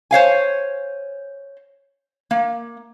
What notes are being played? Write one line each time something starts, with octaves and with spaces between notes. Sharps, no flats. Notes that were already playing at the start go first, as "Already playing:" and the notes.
C5 C#5 F5 G#5
A#3